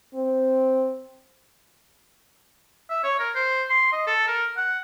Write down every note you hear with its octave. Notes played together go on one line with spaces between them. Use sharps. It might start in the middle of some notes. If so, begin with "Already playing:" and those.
C4
E5
C#5
A#4
C5
C6
D#5
A4
A#4
F#5